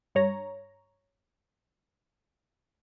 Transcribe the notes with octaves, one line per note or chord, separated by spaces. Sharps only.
G2 C#5 A#5